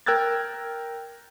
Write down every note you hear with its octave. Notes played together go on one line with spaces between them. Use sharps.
A#4 G5 E6 F#6 G#6 A6